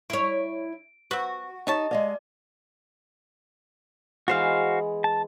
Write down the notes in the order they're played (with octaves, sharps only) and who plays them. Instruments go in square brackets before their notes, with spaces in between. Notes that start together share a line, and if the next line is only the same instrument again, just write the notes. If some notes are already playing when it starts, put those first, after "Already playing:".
[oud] E4 C#5 [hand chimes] D7
[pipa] C4 B4 [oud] F#4
[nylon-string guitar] D#4 [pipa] G4 C#5 A5 [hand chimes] D#5
[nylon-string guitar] G#3 D#5 F5 [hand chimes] D5
[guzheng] E3 G#3 B3 [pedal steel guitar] F#4 C5 F5
[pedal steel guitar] A5